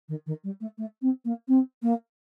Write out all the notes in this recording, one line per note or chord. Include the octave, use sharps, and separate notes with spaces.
D#3
D#3
G3
A3
A3
C4
A#3
C4
A#3